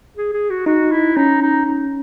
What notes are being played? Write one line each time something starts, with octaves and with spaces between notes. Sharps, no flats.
G#4
G#4
F#4
D#4 F#4
E4
C#4 D#4
D#4
D#4